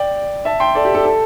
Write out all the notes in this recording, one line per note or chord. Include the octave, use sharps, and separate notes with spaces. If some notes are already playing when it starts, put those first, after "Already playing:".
Already playing: D5 G5
E5 A5
G5 C6
A4 D5
G4
A4
A4